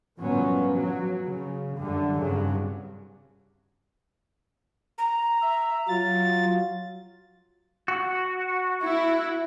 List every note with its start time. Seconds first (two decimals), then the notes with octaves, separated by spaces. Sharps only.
0.19 G1 A#2 F3 F#3 B3 C#4
0.76 F#3
1.25 C#3
1.78 F#2 D3 G3
2.21 C2 G2 C#3 F#3
4.98 A#5
5.42 E5
5.89 F#3 F4 A6
7.88 F#4
8.82 E4